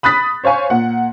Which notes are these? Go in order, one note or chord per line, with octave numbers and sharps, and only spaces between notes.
B5 D#6 F#6 A6 B6
C5 C#5 F5 G#5 C#6
A#2 F#5